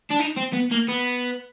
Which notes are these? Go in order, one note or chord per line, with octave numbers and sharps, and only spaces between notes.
D4
D#4
C4
B3
A#3
B3